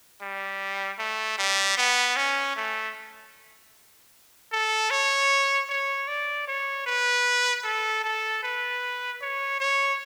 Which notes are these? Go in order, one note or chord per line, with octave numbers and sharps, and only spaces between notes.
G3
A3
G3
B3
C#4
A3
A4
C#5
C#5
D5
C#5
B4
A4
A4
B4
C#5
C#5